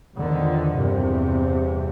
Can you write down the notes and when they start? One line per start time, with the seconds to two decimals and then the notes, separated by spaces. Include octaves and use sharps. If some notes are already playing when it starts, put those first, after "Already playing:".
0.18 E2 D3 D#3 F3
0.76 E2 G2 C3